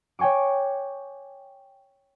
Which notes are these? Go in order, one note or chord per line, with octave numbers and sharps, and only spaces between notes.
C#5 G5 G#5 C#6 D6